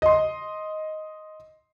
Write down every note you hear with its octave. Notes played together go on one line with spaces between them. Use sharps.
D#5 C6